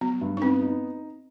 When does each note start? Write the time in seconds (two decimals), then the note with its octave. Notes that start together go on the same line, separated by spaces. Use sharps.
0.01 F#3 B3
0.21 G2
0.37 D#4
0.42 B3 C4
0.61 D#4